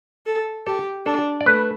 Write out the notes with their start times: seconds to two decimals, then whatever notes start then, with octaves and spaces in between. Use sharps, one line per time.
0.26 A4
0.66 G4 A4
1.06 D4 A4
1.41 D5
1.46 A3 B4